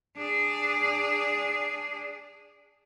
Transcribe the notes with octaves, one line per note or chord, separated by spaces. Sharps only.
D4 G#4